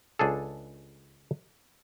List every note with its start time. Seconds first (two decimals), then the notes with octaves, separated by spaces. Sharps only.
0.19 C#2 D4 G#4 A4